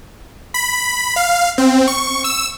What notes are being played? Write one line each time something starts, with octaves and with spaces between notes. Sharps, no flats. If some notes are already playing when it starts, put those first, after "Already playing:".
B5
F5
C4
C#6
E6